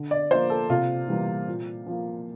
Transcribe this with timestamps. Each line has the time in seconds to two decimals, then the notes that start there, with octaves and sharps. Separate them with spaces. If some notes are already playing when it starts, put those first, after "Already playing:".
Already playing: D3
0.11 D5
0.31 F3 C5
0.35 A#3
0.50 A4
0.70 C3 F4
1.08 E3 G3 A#3
1.48 A#2
1.86 F3 A#3